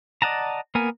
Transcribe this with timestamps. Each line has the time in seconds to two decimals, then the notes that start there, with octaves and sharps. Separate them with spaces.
0.22 D5 D#5 F#5 A5 A#5
0.75 A#3 B3 A#4 G#5